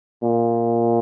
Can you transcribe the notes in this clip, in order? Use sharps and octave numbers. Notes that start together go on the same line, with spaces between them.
A#2